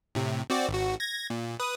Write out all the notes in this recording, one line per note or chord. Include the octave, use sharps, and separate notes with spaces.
A2 C3
C4 F#4 D5
G#1 F#4
G#6 A#6
A#2
B4 D#6